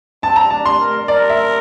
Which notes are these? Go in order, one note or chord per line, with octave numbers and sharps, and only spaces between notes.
C4 A5
A#5
D4 A5
C6
A#4
A#4 D5
E5